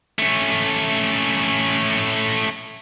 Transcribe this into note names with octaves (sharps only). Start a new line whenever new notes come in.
A3 C#4